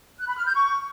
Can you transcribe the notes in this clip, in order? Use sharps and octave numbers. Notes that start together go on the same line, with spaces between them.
F#6
B5
F6
G6
C#6